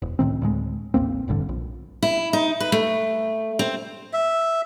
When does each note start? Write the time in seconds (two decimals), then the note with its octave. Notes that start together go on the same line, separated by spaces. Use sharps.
0.02 E1
0.19 C#2 A2 D#3 C4
0.42 D2 A2 G#3
0.94 A1 D#2 A#3 C4
1.28 E1 A1 G2 D3
1.49 A#1
2.03 E4
2.33 D#4
2.60 B4
2.72 A3
3.59 C4
4.13 E5